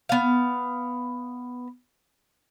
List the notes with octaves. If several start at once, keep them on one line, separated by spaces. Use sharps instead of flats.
B3 F5